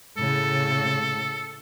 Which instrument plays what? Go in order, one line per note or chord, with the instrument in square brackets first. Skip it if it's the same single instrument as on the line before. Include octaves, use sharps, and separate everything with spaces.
[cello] A2 C#3 [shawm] A4